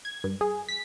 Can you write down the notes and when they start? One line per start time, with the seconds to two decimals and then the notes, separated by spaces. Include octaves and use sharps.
0.05 G#6
0.24 G2
0.41 G#4
0.69 B6